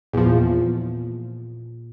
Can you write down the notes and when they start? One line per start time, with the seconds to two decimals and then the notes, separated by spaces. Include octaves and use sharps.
0.13 E2 A#2 F3